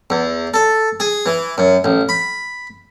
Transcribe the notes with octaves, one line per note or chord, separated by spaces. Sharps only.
E2
A4
G#4
E3
F#2
A1
B5